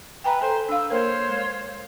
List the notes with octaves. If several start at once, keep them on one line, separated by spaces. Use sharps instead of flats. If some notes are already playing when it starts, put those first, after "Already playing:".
B4 E5 G5 G#5 A#5
A4 C5 G#5
D4 F5 E6
A#3 A#4 C5 C#5 F5
G#3